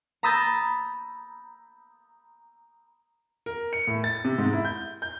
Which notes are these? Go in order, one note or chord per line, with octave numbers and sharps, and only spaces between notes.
A#5 B5 D#6 E6 G6 A6
A#4
C#7
A2
A6
C3
G#2
E4
G6
G6